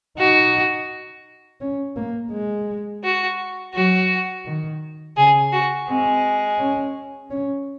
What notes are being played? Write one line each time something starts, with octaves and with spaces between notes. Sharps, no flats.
D#4 F#4
C#4
A#3
G#3
F#4
F#3 F#4
D#3
C#3 G#4
F#4
G#3 C4
C#4
C#4